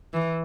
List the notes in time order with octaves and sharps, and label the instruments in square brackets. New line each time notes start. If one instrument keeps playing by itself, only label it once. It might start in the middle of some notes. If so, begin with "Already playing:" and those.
[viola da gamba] E3